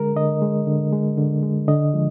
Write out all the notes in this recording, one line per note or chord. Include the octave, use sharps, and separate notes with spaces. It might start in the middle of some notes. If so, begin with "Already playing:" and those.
Already playing: D3 G#3 A#4
D3 D#5
G#3
D3
G#3
D3
G#3
D3 D#5
F3 G#3